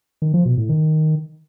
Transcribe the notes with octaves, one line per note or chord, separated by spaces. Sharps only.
D#3
F3
B2
A2
D#3